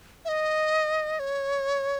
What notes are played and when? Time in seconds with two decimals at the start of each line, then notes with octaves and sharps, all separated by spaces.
0.25 E5
0.29 D#5
1.19 C#5